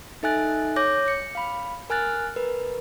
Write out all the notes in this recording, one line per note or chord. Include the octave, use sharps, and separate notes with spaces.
D#4 A4 E5 G#5 F#6 A6
C#5 D6 G6 A#6
C#7
F5 B5
A#4 G#5 F6 F#6 A6
A#4 B4